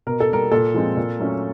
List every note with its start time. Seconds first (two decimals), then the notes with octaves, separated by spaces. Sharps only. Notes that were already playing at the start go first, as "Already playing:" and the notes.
0.07 B2 A#4
0.20 A4
0.29 G3 A#3 A#4
0.52 A#2 A4
0.74 F3 G#3 C4
0.97 A#2
1.20 F#3 A3 C#4